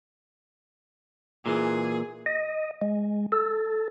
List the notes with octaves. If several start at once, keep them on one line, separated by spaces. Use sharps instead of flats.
A#2 E3 G#4
D#5
G#3
A4